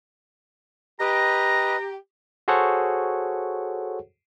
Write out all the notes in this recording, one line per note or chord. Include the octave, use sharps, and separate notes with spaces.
G4 B4 D#5 A#5
F#4 G#4 A4 C5 C#5 F#5